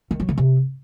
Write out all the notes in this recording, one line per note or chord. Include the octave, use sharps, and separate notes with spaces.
D#3
F#3
D3
C3